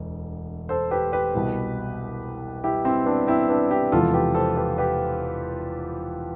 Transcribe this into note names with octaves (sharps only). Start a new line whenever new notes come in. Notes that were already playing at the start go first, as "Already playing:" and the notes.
Already playing: E1 D2
A4 C5
G4 B4
G4 B4
C2 B2
E4 G4
C4 E4
B3 D4
C4 E4
B3 D4
E4 G4
E1 E2 C3 F3 F4 A4
G4 B4
A4 C5
G4 B4
G4 B4